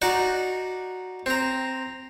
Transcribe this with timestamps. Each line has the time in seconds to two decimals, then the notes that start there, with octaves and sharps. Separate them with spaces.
0.02 D#4 F#4 D5
1.26 C4 A#5